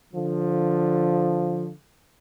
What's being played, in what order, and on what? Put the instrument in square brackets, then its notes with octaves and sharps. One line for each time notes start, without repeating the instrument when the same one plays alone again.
[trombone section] D3 F3